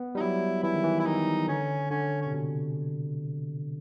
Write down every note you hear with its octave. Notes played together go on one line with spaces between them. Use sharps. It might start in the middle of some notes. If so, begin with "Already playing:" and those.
Already playing: B3
G3 D#4
F#3 E4
E3 E4
D#3
E3
E4
D#3 D#4
D3 C#4
D3 C#4
C#4
C3
B2